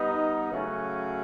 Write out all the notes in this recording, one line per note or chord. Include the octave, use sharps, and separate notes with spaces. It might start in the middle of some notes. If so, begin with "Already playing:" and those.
Already playing: G3 B3 D#4
C#3 F#3 A3 C#4 F#4